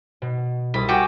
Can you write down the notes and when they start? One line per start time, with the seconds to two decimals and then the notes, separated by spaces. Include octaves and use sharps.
0.22 B2
0.74 C2 B5 D6 D#6
0.89 F#4 G4 G5 G#5 C#6